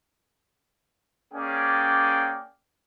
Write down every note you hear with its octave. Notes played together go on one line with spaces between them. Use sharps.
A#3 C#4 G#4 D5 G5